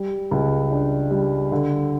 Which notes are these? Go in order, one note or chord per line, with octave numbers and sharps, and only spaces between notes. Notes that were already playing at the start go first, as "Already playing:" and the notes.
Already playing: G3
C#2
D4
G3
D3